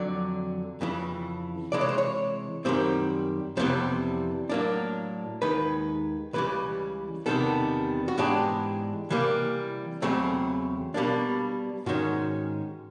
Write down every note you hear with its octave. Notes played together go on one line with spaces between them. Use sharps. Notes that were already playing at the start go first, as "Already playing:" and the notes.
Already playing: F2 D3 F#3 D5
F2 C#3 E3
C3 E3 G#3 D5
C#5
C5
C#5
F#2 D#3 G3 C4 C5
F2 C3 E3 G3 B3 C5
A2 F#3 A#3 D4
D#2 D#3 G#3 B4
C#2 C#3 E3 G3 B4
E2 C3 D#3 G3 B3 A4
F#4
G#2 E3 G#3 B3 D4 G4
C3 E3 G3 A#3
E2 C#3 F#3 A3 C4
B2 G3 A#3 D4
G#2 D#3 G#3 C#4 F#4